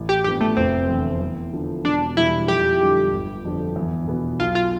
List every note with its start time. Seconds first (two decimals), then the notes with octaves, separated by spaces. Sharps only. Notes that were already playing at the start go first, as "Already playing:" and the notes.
Already playing: A1
0.09 G4
0.24 G2 F3 B3 D4 G4
0.41 A3
0.57 F1 C4
0.89 E2 D3
1.20 E2
1.52 D3 F3
1.85 E1 D4
2.17 E2 B2 G3 E4
2.48 F2 G4
2.81 D3 G3
3.13 G1
3.45 F2 D3 F3
3.76 E2
4.08 B2 B3
4.40 B1 F4
4.55 F4